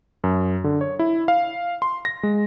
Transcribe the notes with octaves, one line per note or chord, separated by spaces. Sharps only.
F#2
D3
C#5
E4
F5
C6
A#6
G#3